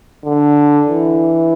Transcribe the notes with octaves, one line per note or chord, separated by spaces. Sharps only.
D3
E3